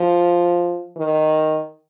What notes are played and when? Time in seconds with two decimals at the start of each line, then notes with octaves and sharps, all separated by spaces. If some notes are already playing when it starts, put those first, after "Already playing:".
Already playing: F3
0.97 D#3